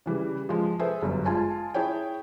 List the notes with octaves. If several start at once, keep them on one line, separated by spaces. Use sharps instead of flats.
C#3 E3 G3
F3 G#3
G#4 A4 B4 C5 E5
G1 F#2
G#3 F4 G#5 A5
E4 G#4 C#5 G5